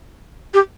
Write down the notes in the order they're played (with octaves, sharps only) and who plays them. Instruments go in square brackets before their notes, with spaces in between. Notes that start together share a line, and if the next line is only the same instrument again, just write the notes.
[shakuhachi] G4